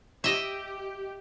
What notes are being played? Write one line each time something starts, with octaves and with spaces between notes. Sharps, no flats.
G4 D#5 E5